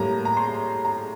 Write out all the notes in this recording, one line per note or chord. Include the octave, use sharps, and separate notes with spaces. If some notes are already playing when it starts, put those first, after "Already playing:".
Already playing: A2 G3 A#3 A#5
A#5
C6
A#5